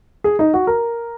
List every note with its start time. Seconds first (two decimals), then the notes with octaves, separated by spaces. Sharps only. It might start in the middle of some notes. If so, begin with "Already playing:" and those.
0.24 G#4
0.39 D#4
0.54 F#4
0.67 A#4